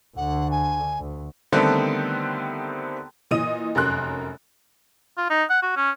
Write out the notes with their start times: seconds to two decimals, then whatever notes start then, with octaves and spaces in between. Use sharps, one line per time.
0.17 D2 D3 F#5
0.51 G#5
1.00 D2
1.53 D3 D#3 G3 A3 B3 C4
3.31 A#2 E3 D#5 D#6 D#7
3.75 F1 F#2 C#4 A#4 C6 F#6
5.17 F4
5.30 D#4
5.49 F#5
5.62 F#4
5.77 C#4